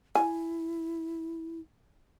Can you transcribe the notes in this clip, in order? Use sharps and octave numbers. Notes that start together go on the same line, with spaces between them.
E4 G#5